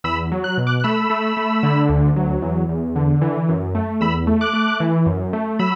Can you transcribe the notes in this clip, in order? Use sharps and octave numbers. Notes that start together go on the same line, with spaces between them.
E2 B5 E6
F#3
F#6
B2
D6 F#6
F#6
A3 B5 E6
A3
A3
D3
D2
F#3
E2
E2
D3
E3
F#2
A3
E2 B5 E6
A3
D6 F#6
A3
E3
F#2
A3
F#3 B5 E6